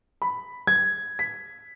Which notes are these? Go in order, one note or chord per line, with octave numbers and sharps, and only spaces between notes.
B5
G#6
B6